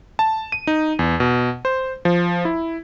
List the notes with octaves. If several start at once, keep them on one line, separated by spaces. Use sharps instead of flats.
A5
D#7
D#4
E2
B2
C5
F3
E4